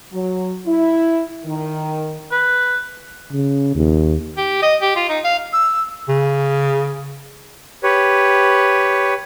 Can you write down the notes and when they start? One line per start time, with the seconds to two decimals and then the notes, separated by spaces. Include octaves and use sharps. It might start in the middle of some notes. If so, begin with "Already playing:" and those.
0.13 F#3
0.66 E4
1.45 D#3
2.31 B4
3.32 C#3
3.75 D#2
4.37 G4
4.62 D#5
4.82 G4
4.96 F4
5.09 D#4
5.25 F5
5.53 E6
6.08 C#3
7.83 G4 B4 C#5